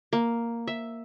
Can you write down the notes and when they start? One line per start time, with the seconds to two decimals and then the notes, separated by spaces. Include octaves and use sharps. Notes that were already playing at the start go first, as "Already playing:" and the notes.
0.13 A#3
0.67 E5